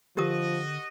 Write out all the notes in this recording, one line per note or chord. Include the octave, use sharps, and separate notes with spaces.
D3 F3 F#4 G4 A#4 D#5 D#6